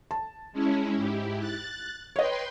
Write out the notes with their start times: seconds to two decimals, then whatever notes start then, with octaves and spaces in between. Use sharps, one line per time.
0.11 A5
0.53 G#3 C#4 E4
0.96 G#2 E4 G4
1.40 F#6 A6
2.16 B4 C#5 D#5 G5 C6